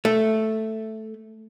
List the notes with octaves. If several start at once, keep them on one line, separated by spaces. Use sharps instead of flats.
A3